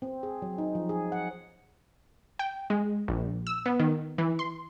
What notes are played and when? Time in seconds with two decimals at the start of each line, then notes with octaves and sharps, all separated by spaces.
0.02 C4
0.23 G#4
0.42 F#3
0.58 D#4
0.75 F3
0.89 G#4
1.12 F#5
2.39 G5
2.70 G#3
3.08 A#1
3.47 E6
3.66 B3
3.79 D#3
4.18 E3
4.39 C6